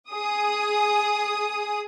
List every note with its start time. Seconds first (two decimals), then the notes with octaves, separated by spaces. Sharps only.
0.10 G#4 D#6